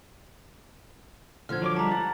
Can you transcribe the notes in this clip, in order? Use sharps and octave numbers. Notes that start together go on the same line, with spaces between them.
D3 F3 F6 G#6
F#3 C#5 D6
G3 G#3 D4 A5 A#5
F#5 A6